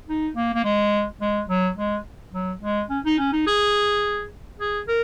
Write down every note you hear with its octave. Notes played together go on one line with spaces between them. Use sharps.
D#4
A#3
A#3
G#3
G#3
F#3
G#3
F#3
G#3
C#4
D#4
C#4
D#4
G#4
G#4
A#4